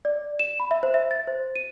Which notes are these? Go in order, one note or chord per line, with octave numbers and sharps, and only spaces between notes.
D5
E7
B5
E5
C5
E5
A6
C5
D#7